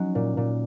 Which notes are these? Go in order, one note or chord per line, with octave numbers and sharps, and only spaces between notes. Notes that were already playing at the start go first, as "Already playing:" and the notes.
Already playing: F#3 C#4 D#4
A#2
A#2